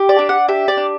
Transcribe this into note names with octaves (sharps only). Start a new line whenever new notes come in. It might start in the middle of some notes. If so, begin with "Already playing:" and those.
Already playing: G4
D5
D4
F#5
G4 E5
D5
D4